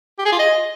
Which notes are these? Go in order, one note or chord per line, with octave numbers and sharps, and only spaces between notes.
G4
G#4
F4
D#5